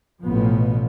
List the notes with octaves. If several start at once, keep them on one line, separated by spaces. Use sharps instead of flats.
A1 B2 F3 B3